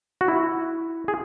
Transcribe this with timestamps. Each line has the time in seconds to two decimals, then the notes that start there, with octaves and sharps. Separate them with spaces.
0.21 F#4
0.28 E4
1.08 G#4